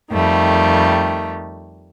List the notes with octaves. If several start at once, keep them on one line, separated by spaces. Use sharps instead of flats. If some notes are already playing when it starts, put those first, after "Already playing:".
F2 D#3 G3 A3